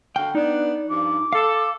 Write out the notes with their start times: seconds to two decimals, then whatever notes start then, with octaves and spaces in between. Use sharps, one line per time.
0.16 D3 F#4 F5 G5
0.35 B3 D4 D#4 D5
0.89 G2 F3 D6
1.33 A4 F5